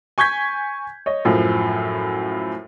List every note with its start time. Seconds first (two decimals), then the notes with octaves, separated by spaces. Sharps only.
0.18 G#5 C#6 G6 G#6 B6
1.06 C#5 D#5
1.25 F#2 A2 F3